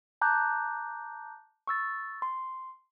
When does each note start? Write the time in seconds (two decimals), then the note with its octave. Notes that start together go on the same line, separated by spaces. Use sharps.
0.21 A5 A#5 D6 F#6 G6
1.67 C#6 E6 A6
2.22 C6